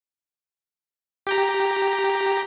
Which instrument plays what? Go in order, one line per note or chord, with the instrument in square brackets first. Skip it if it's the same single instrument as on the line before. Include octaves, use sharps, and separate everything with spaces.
[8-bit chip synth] G4 G5 A#5